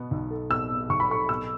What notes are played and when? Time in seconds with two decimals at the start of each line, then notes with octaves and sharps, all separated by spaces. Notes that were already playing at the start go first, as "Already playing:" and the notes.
Already playing: B2 B3
0.11 B1
0.31 A4
0.50 B2 E6
0.71 B3
0.90 B1 C#6
1.00 B5
1.10 A4 C#6
1.29 B2 E6